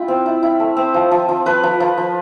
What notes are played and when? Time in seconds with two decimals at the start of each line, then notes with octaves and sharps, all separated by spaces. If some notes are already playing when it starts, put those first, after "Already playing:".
Already playing: E4 F4 G5
0.08 C4
0.26 E4
0.43 E4
0.60 A3
0.76 C4
0.94 F3
1.11 F3
1.29 F3
1.46 F3 B4
1.63 F3
1.80 F3
1.98 F3